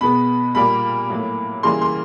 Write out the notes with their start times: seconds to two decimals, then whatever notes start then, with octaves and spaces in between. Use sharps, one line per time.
0.01 B2 G#3 B3 B5
0.55 A#2 G3 A#3 B5
1.10 A2 F#3 A#3
1.63 C#3 E3 G3 A#3 C6
1.81 C6